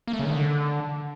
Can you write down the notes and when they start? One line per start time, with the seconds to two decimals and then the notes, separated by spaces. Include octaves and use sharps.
0.07 A#3
0.13 A3
0.19 C#3
0.25 D#3
0.31 D3